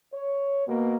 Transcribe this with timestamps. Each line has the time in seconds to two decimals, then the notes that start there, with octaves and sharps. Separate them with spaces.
0.14 C#5
0.67 B2 A#3